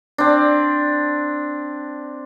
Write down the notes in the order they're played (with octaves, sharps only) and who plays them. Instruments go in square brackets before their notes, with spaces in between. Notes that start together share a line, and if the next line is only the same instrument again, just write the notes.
[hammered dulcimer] C4 D4